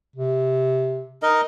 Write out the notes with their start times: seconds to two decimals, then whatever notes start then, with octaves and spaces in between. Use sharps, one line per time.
0.16 C3
1.23 D#4 A#4 D#5